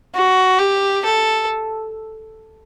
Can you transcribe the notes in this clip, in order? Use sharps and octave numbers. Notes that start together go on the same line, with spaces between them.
F#4
G4
A4